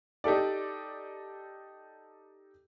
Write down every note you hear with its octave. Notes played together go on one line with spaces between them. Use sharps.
D#4 G4 A4 D5